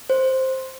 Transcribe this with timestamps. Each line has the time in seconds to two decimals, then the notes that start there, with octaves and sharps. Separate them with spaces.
0.10 C5